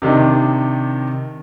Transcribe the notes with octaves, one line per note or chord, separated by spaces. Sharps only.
C3 D#3 D4 D#4